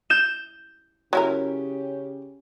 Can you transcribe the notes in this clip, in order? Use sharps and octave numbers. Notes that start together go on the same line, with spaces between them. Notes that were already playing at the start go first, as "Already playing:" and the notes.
G6 E7
C#3 F#3 C#4 E4 G4 A#4